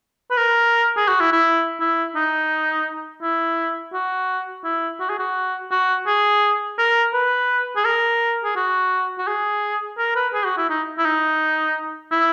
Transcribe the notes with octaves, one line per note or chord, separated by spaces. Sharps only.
B4
A#4
G#4
F#4
E4
E4
E4
D#4
E4
F#4
E4
F#4
G#4
F#4
F#4
G#4
A#4
B4
G#4
A#4
G#4
F#4
F#4
G#4
A#4
B4
G#4
F#4
E4
D#4
E4
D#4
E4